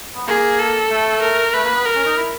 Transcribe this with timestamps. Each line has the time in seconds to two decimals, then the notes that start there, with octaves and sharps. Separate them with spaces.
0.15 B3
0.27 A#3 G#4
0.59 A4
0.90 A3
1.22 A#4
1.53 A3 B4
1.64 A#3
1.75 B3
1.85 A#4
1.96 C#4
2.06 D#4
2.17 E4